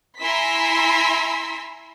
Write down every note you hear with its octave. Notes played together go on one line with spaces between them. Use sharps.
E4 G#5 A#5 C6 E6 B6